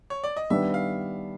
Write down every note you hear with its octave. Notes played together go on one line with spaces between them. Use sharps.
C#5
D5
D#5
D#3 G3 B3 D4 E5
F5